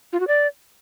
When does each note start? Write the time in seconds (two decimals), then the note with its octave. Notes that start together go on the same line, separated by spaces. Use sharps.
0.13 F4
0.20 F#4
0.28 D5